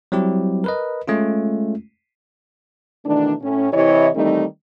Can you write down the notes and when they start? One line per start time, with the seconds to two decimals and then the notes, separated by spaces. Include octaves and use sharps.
0.12 F#3 G3 C4 E4 G4
0.64 A#4 B4 D#5
1.08 G#3 A3 C#4 F4
3.06 B2 D#3 E3 A3 D4
3.42 A2 C#4
3.73 C3 E3 E4 G4 C#5 D#5
4.16 D#3 E3 G3 A3 C4 D#4